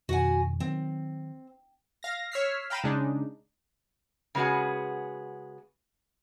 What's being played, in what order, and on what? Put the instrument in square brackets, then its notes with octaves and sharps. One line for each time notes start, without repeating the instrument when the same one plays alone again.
[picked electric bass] F2 B2 D#3 [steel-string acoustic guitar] F#4 F#5 G#5
[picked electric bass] D#3 F#3 [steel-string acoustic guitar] C4
[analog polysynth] F5 A#6
C#5 E6 F6 B6 C7
F5 G5 A#5 B5 D#7 E7
C#3 G#3 D4 D#4
[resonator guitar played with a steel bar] C#3 G#3 B3 F#4 G#4